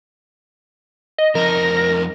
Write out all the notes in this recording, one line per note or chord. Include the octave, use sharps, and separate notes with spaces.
D#5
F2 D#4 A#4 A#6